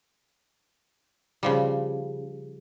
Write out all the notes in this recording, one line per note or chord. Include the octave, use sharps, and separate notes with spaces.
C#3 F3 G3